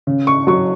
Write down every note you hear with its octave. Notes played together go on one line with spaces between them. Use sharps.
C#3
C#6
F#3 C#6